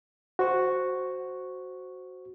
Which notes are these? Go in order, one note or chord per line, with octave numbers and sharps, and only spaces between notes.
F#4 C5 C#6